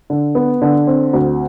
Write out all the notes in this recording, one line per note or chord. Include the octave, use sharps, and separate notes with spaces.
D3
B3
D3
C4
D2